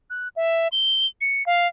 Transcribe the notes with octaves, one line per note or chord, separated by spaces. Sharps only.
F#6
E5
G7
C#7
F5